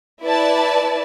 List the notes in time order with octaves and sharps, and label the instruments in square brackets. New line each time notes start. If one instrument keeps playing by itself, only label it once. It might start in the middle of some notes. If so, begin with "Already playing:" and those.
[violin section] E4 B4 D5 A5